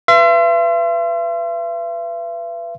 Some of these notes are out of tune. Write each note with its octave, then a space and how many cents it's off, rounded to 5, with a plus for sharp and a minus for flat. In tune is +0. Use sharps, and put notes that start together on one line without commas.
B4 +0 E5 +45 C6 +0